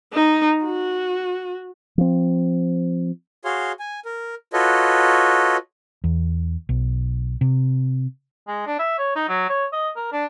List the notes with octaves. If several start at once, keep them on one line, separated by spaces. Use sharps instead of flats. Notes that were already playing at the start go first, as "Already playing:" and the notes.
D#4
F#4
F3 C4
F#4 G#4 C#5 F5 C6
G#5
A#4
F4 F#4 A4 B4 C#5 D#5
E2
B1
C3
G#3
D4
E5
C#5
D#4
F#3
C#5
D#5
A#4
D4